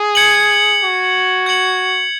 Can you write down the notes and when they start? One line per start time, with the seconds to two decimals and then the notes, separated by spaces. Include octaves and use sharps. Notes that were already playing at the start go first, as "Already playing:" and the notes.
Already playing: G#4
0.15 G#6 C#7 F#7
0.81 F#4
1.46 G#6 C#7 F#7